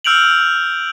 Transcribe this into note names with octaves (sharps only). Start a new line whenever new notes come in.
E6 F6 G6 D7 F7 F#7